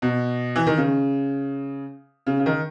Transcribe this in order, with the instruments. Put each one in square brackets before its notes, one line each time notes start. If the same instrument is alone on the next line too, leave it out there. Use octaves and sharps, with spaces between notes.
[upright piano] B2
E3
D#3
C#3
C#3
C#3
D#3